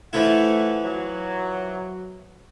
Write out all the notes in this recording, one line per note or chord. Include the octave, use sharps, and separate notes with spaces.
E3 F3 A3 E4 F#5
F#3